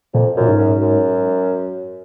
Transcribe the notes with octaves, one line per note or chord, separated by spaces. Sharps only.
F2 A#2
F#2 A#2
G#2
F#2
F#2